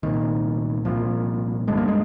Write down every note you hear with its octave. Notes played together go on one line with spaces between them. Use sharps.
C2 A#2 D#3
C2 A#2 F3
G1 G2 D3 G#3
A#3
G#3